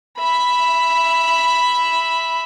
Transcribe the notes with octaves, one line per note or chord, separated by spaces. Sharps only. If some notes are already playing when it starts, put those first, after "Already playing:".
E5 B5